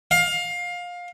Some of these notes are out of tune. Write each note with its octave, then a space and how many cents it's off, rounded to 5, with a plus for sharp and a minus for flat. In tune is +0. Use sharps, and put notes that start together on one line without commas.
F5 +20